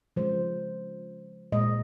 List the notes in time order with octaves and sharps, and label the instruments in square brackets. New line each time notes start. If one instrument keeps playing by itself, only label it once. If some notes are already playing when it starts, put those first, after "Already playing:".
[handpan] C#3 F3 G#3 C5
A#2 G#3 D#5